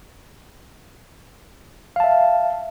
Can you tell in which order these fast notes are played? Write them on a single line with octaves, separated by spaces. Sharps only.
F5 A5 E5